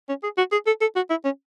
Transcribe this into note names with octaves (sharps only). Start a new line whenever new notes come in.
C#4
G#4
F#4
G#4
A4
A4
F#4
E4
C#4